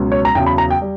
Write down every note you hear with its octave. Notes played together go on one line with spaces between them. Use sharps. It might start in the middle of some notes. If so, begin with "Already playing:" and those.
Already playing: C#2 B2 F#3
C#5
A#5
E2 C#3 F#3 G5
B5
A#5
G5
G3